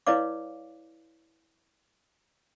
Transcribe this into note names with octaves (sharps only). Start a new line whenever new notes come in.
E4 B4 C#5 D5 F5 D6